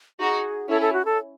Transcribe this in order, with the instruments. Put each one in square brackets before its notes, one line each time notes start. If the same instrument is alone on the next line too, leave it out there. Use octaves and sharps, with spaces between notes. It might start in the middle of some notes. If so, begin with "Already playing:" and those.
[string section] D#4 F#4 [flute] G#4
[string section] C#4 E4 [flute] A4
[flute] A4
F#4
A4